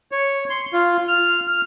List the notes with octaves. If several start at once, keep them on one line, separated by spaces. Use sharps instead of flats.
C#5
C6
F4
F6
F6